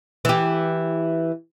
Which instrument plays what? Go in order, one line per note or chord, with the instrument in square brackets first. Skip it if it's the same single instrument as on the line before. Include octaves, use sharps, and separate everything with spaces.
[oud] E3 G4